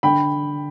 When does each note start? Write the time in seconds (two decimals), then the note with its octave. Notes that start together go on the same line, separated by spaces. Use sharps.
0.03 D3 G5 B5